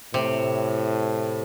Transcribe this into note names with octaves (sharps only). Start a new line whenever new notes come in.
A2 C3